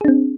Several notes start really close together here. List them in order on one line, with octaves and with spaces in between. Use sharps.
G#4 D4 C4